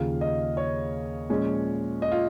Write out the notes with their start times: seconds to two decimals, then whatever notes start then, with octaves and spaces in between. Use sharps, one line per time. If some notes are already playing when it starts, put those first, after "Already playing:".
Already playing: D#2 C#3 F3 F5
0.21 D#5
0.57 C#5
1.30 A#2 F3 G#3 C#4
2.02 D#5
2.12 F4